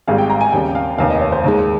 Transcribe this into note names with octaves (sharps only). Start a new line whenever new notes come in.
G#1 G#2 G3 F5
G5
A#5
G#5
D#2 C#3 G3 G5
F5
F1 D#2 D#3 F5
D#5
C#5
C5
D#2 D#3 G#3